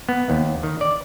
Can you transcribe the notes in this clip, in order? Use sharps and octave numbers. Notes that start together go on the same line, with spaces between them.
B3
D#2
D#3
D5